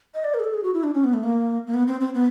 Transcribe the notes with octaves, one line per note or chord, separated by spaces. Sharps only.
D#5
D5
A#4
G#4
A4
G#4
F#4
E4
D4
C#4
B3
A3
A#3
A#3
B3
C4
C4
B3